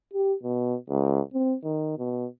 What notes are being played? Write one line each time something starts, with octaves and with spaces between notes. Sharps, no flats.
G4
B2
C#2
C4
D#3
B2